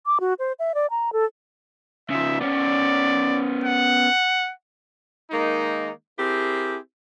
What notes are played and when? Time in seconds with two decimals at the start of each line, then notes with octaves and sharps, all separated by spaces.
0.06 D6
0.20 F#4
0.39 C5
0.59 E5
0.75 D5
0.90 A#5
1.13 A4
2.10 C#3 F3 E5
2.41 B3 C#4 D5
3.64 F#5
5.31 D#3 G#3 A#3 D#4
6.18 C4 E4 G4 G#4 A#4